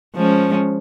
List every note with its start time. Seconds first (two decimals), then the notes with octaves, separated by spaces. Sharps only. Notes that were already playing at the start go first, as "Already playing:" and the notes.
0.16 F3 G#3 C#4